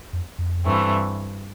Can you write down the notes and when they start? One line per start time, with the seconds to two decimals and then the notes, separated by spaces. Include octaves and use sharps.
0.13 F2
0.39 F2
0.65 G2 E3 A3 C4